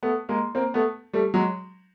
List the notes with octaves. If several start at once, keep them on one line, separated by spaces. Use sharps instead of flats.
A3 B3
G#3 A#3
A#3 C4
A3 B3
G3 A3
F#3 G#3